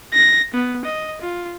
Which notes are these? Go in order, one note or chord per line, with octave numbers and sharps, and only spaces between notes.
A#6
B3
D#5
F4